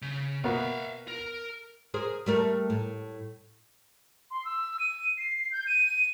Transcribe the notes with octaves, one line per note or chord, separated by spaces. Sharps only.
C#3
B2 A#3 B3 E5 F5
A#4
G#4 A#4 C5
G3 A3 A#4
A2
C6
E6
D#7
C7
G6
D#7